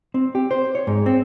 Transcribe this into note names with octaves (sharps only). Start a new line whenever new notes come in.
C4
G4
C5
C#5
G#2
C4